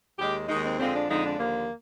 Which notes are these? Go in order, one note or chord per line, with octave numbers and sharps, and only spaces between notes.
D#2 D#3 G#3 G4
D#2 D#3 G#3 D#4
C4
F2 D3 F3 G#3 C4
D4
F2 D3 F3 G#3 D#4
D4
D#2 D3 F3 A#3